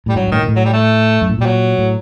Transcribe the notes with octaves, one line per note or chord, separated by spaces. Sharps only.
A2 G3
G2 F#3
G2
A2 D#3
A#2
A2
F#3
G3
A3
F#2
A2
A#2 G3
F#3
A2